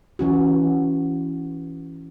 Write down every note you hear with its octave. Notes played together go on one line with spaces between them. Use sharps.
E3 C#4 F#4